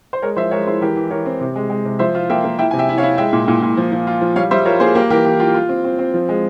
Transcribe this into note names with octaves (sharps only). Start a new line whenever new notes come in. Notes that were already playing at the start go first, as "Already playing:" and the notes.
C5
G#3 A#4 C#5
F3 C5 E5
G#3 A#4 C#5
E4 G#4 C5
E3 G4 A#4
E3
E3 A#4 C#5
C4
C3
G#3
G#3
C3
F3 C5 E5
F4
A#3 E5 G5
A#3
E4 E5 G5
G#5
C3
E5 G5
E4
C#5 F5
E4
G#3 E5 G5
A#2
A#2
A#2
F3
F3
F4
F3
G3 C#5 F5
G3 C5 E5
F4 A#4 C#5
A#3 G#4 C5
A#3 G4 A#4
E3 G4 A#4
E3 G4
F4 G4
F4
C4
C4
C4
F3
G#3